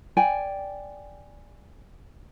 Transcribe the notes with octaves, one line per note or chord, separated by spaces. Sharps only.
D5 G5 G#5